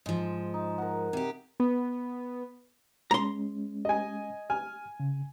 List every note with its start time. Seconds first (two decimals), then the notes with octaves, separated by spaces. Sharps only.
0.06 G#2 F3 G#3
0.54 D#4
0.78 A#4 F#5
1.13 C3 G4
1.60 B3
3.11 G#3 C#4 A#5 C6
3.85 D#5 G#5
4.50 G#5 F6
5.00 C#3